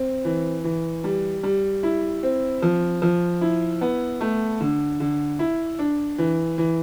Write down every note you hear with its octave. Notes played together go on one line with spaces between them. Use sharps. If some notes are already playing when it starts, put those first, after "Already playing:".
Already playing: C4
E3
E3
G3
G3
E4
C4
F3
F3
E4
B3
A3
D3
D3
E4
D4
E3
E3